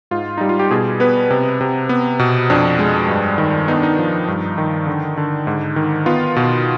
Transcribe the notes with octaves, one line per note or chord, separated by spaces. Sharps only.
G#2 F4
G3 D#4
F4
G4
B2 G#4
B3 B4
C3
C3
B3
B2
F2 D4
G#3
G2
D#3
B3 D#4
D4
D#4
F3
G2
D#3
D3
D3
G#2
D#3
B3 F4
B2